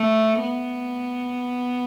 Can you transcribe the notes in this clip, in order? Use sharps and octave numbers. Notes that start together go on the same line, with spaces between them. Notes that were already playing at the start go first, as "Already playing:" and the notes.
Already playing: A3
B3